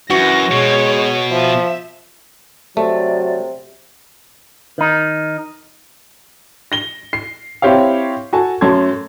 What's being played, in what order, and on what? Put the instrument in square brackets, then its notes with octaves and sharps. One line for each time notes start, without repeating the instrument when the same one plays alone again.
[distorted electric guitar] F#2 [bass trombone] E3 [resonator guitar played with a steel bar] F#4 [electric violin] A#6
[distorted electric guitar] B2 [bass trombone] G#3 [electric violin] C#5
[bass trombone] F3 [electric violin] E5
[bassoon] C3 [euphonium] F#3 [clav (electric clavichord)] A3 [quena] D5
[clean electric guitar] D#3 D#4
[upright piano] A#6 G7
C7
C4 E4 G4 C#5 F5
F#4 A4 G#5 A5
F#2 A3 C#4 A5 C6 G#6